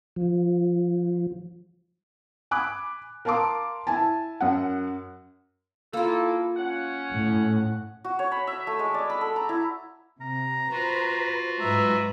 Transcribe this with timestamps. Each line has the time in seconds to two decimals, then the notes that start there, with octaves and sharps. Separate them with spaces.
0.16 F3
2.51 G#5 B5 D6 F#6
3.25 A#4 F5 A5 C6 D6
3.87 E4 G#5 A5
4.41 F#2 F#5
5.93 A#3 E4 F4 A4
6.57 C#4 F#5
7.13 A2
8.04 F#4
8.19 C#5
8.32 B5
8.47 E5
8.67 A3
8.79 G#3
8.94 D5
9.10 B5
9.21 A4
9.36 A#5
9.49 E4
10.21 C3 A#5
10.71 F4 F#4 B4 C5
11.61 G#2 F#3 G#3 B4 E5 A#5